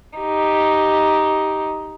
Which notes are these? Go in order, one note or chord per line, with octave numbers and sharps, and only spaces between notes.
D#4 G4